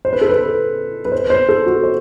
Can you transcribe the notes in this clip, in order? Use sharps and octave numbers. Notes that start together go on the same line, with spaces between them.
C5
B4
A4
B4
B4
C5
C5
A4
F#4
C5